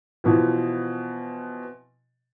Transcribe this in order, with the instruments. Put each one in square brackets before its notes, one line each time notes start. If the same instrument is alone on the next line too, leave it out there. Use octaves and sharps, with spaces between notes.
[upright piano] B2 E3 F3